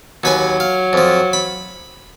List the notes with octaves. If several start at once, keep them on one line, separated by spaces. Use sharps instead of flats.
D#2 F#3 B4 G#5
F5
F2 F3
B5